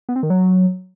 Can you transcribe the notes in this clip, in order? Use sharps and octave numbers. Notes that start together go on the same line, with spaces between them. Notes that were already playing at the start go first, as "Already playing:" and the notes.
B3
C4
D#3
F#3